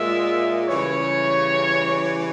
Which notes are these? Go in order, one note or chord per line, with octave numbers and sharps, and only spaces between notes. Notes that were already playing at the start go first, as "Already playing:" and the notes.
Already playing: A#2 G#3 E5
C#3 E3 G3 C#5